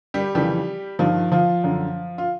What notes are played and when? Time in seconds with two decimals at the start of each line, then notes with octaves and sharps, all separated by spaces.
0.14 G3 G4
0.35 F2 C#3 E3 G3 G4
0.99 G2 D#3 F3 F4
1.32 F3 F4
1.64 F#2 D3
2.18 F4